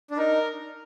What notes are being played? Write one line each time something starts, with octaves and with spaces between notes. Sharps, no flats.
D4
D#4 A#4